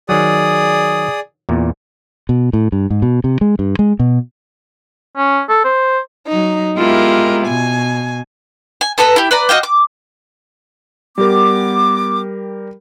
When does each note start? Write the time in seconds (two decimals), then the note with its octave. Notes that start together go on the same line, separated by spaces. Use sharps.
0.09 D#3 F#3 G#4 D5 D#6
1.49 E2 A#2
2.29 B2
2.53 A2
2.72 G2
2.90 G#2
3.02 B2
3.24 C3
3.41 G#3
3.59 G2
3.79 G#3
3.99 B2
5.17 C#4
5.49 A4
5.64 C5
6.29 F#3 D#4
6.75 G#3 B3 E4 F4 G4 A#4
7.46 B2 G#5
8.81 G#5
8.98 B3 A4 B4 A#5
9.16 E4 G4
9.31 B4 D5 A#5
9.49 F#4 D#5 F5 G5
9.63 D6
11.18 G3 B3 G4 A#4 D6